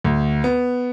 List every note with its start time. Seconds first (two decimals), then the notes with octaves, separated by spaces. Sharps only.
0.04 D2
0.44 B3